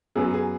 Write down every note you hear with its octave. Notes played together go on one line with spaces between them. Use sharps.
F#2 F#3 B3 G#4
G#4